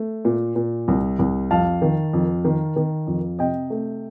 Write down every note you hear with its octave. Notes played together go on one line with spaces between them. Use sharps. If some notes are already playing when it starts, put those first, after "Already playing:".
Already playing: A3
A#2
A#2
C2
C2
F2 F5 A5
D#3
F2
D#3
D#3
F2
C3 D#5 G5
A3